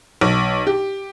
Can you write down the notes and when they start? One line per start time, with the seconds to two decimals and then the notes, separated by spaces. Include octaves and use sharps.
0.21 B1
0.67 G4